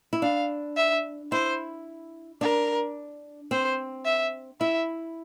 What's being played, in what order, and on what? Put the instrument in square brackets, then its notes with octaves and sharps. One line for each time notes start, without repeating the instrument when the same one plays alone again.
[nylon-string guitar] E4
[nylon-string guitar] D4 [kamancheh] F5
[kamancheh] E5
[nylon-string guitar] E4 [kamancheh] C5
[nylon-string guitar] D4 [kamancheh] A#4
[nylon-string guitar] C4 [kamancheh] C5
[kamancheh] E5
[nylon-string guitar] E4 [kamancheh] E5